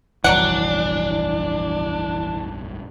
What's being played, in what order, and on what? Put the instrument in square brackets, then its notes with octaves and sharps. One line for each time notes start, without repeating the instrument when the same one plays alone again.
[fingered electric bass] F1 A#1 G2 [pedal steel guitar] E3 [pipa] F#3 D5 F#5 [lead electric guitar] D4